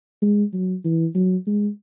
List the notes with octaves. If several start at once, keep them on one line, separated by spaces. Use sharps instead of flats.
G#3
F#3
E3
F#3
G#3